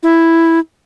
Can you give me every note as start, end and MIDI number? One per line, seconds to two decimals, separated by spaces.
0.03 0.59 64